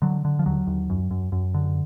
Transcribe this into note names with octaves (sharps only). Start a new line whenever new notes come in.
D3 F#3
D3
F3
D#2 F#3
D#2
F#2
F#2
F#2
D3